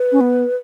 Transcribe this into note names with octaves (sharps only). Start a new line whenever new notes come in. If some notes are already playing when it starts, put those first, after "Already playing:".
Already playing: B4
C#4
B3